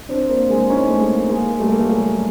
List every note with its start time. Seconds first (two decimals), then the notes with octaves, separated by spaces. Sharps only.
0.09 C4 D4
0.29 A#3 C4
0.49 G#3 A#3
0.69 C#4 D#4
0.88 A3
0.99 G#3 A#3
1.29 G#3 A#3
1.59 G3 A3
1.70 A#3
1.79 A3
1.90 F#3 G#3
2.13 G3